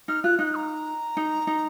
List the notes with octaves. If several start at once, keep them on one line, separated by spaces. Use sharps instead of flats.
D#4 F6
F4 F#6
D#4 F#6
A#5
D#4
D#4